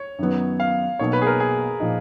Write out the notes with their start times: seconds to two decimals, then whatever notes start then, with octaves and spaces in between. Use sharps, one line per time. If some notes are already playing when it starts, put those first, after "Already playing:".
Already playing: C#5
0.19 F#2 D#3 F#3 B3
0.60 F5
0.99 B1 B2 A#3 C#5
1.13 B4
1.22 G#4
1.27 A#4
1.40 G#4
1.80 A#2 F3 A#3 D#4